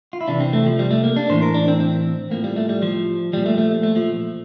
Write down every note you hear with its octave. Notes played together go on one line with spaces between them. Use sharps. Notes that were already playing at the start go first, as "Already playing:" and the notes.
F4
E4
C3 E3 D4
C4
A3
F3
G3
A3
A#3
D4
A2 E3 C5
A#4
D4
C4
C4
A2 F3 A#3
G3
A3
G3
F3
A#2 F3 G3
A3
A3
A3
F3